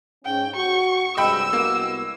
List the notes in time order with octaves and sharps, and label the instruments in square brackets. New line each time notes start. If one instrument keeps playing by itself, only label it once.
[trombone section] G#2 C#4 [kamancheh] G5
[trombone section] F#4 [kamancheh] C#6
[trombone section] G2 C3 G#3 [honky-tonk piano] D#5 G5 B5 [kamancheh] E6
[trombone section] C2 B3 F#4 [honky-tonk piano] A#3